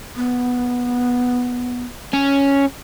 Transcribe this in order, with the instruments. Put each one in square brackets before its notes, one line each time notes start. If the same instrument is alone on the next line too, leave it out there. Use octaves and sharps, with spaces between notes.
[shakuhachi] B3
[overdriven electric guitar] C#4